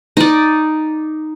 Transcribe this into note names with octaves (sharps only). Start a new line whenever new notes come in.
D#4 D5